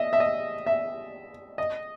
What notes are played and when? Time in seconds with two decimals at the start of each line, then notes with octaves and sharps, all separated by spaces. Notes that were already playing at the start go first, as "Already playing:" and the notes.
Already playing: D#5 E5
0.13 E5
0.20 D#5
0.66 E5
1.58 D#5